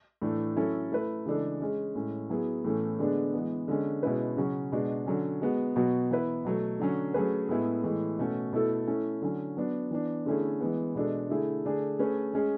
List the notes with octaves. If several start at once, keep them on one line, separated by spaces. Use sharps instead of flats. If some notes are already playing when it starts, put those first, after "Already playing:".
A2 E3 A3 D4
F#3 C#4 E4 A4
A3 E4 B4
C#3 E3 G#3 D4 A4
G#3 C#4 G#4
A2 G#3 C#4
F#3 B3 E4 G#4
A2 E3 A3 C#4
D3 G#3 B3 D4 G#4
E3 G#3 B3
D3 G#3 C#4
B2 G#3 C#4 E4 B4
C#3 F#3 C#4 F#4
B2 G#3 D4 F#4
D3 F#3 C#4
G#3 B3 F#4
B2 F#3 B3 F#4
E3 B3 E4 B4
B2 F#3 A3
D3 F#3 C#4
F#3 A3 C#4 G#4 B4
A2 G#3 B3 E4 G#4
A2 E3 G#3
B2 A3 C#4 F#4
B2 A3 E4 A4
A3 C#4 E4
D3 F#3 C#4
F#3 B3 D4
E3 B3 D4
D3 A3 C#4 E4 G#4
E3 G#3 B3
B2 G#3 D4 A4
D3 A3 E4 G#4
D3 A3 D4 G#4
A3 C#4 G#4 B4
G#3 C#4 G#4